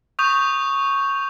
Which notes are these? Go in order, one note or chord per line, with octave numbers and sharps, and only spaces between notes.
C#6 D#6 G6 F7